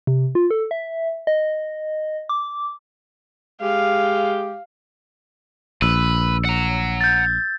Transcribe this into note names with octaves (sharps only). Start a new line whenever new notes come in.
C3
F4
A4
E5
D#5
D6
G#3 G4 F5
A#1 B4 E6
F#5 A#5
G6 A6